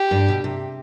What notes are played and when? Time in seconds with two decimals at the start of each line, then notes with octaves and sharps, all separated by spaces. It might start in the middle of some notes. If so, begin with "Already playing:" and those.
Already playing: G4
0.11 G2
0.28 B2
0.44 C3